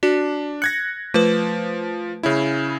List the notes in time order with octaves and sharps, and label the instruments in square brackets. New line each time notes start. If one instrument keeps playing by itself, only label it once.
[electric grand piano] D4 [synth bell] F#4
[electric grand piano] F#6 G#6 A#6 [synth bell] C#7
[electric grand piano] F3 [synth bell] A3 B4
[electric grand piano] C#3 C#4 E4